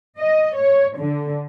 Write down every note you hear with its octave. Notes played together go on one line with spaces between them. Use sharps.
D#5
C#5
D3